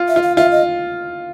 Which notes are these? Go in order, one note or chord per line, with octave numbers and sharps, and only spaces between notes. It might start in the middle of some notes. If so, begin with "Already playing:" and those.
Already playing: F4
E5
F4
F5
F4 E5
D#5